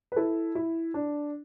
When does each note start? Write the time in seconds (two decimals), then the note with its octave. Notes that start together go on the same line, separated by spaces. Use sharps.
0.12 B4
0.16 E4 A4
0.55 E4
0.94 D4